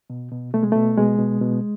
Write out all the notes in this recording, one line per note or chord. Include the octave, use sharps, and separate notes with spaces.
B2
B2
B2 A3
G#3
B2 A3
B2 G#3
B2
B2